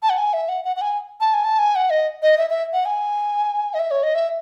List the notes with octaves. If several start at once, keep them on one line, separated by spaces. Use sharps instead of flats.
A5
F#5
G#5
E5
F#5
F#5
F#5
G#5
A5
G#5
A5
G#5
F#5
D#5
D#5
E5
E5
F#5
G#5
D#5
E5
C#5
D#5
E5